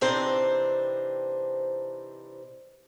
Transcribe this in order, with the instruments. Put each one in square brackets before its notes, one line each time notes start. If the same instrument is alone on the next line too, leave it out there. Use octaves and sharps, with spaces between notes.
[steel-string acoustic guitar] C3 E3 C4 D4 D#4 C5